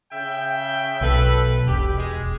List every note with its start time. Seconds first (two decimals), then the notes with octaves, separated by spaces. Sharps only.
0.11 C#3 E5 G5
1.01 B1 A4 B4
1.67 E1 G4
1.96 G#3